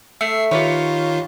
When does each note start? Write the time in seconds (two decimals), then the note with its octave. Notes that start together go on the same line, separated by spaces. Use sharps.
0.21 A3 E5 C7
0.51 D#3 F4 G4 B4 C#5